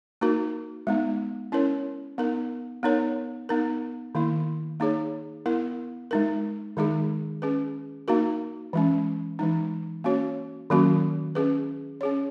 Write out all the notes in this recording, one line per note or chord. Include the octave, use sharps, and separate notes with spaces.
A#3 D#4 F#4 A#4
G#3 B3 D#4
C#4 E4 A#4 C#5
B3 D#4 A#4
B3 D#4 A#4 C#5
B3 D#4 A#4
D#3 A#3 E4
A#3 D#4 G#4 C#5
B3 E4 A#4
G#3 D#4 A#4
D#3 G#3 D#4 G#4
C#4 G#4 B4
A#3 D#4 F#4 A#4
E3 G#3 C#4
E3 G#3 D#4
A#3 C#4 F#4 C#5
D#3 F#3 A#3 C#4 F#4
C#4 G#4 B4
C#4 G#4 C#5